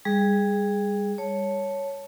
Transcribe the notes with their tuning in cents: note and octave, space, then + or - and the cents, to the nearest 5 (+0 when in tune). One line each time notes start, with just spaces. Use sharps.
G3 +30 G#4 +0
C#5 +0 A5 +0